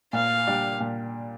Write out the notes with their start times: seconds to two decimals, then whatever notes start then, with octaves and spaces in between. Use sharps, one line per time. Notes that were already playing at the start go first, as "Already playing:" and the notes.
0.13 A#2 F5
0.47 G3 D4 G4
0.80 A#2